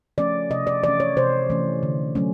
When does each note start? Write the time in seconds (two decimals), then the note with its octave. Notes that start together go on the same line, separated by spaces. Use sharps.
0.18 F3 A3 C#4 D5
0.50 C3 D#5
0.67 D5
0.83 E3 A3 C#4 D5
1.00 C#5
1.17 C3 C5
1.50 E3 A3 C#4
1.83 D3
2.15 F#3 A3 C#4